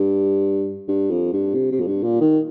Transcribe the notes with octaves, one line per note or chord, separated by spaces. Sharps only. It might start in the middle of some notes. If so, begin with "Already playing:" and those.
Already playing: G2
G2
F2
G2
C3
C3
F2
G2
A#2
D#3